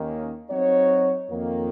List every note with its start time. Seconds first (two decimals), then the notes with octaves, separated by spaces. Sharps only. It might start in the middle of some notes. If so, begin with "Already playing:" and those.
Already playing: D#2 D#3 A#3 C#4
0.50 F#3 C4 D#4 F#4 C#5
1.29 F2 D#3 A#3